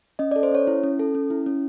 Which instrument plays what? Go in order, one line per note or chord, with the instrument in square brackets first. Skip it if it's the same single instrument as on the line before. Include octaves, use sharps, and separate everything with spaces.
[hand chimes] C#4 D#5
D5
A4
C5
C#4 C#5
E4
C#4
A4
C#4
E4
C#4